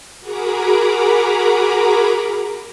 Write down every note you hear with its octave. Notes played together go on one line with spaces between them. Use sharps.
F#4 G#4 A#4 A#5 B5 D6